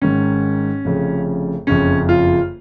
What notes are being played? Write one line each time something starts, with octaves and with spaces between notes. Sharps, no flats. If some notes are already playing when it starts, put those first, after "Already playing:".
G#1 G#2 D#3 C#4
F1 F2 C#3
F#1 F2 C#3 C#4
F4